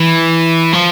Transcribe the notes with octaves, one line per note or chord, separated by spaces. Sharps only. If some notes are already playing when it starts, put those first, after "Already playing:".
Already playing: E3
F3